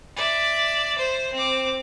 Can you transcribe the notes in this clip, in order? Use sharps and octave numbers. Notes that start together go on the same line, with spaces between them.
D5 E5
C5
C4 D6